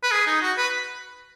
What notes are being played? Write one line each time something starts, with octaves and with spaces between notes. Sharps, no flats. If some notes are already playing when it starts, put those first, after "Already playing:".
B4
G#4
D#4
F#4
B4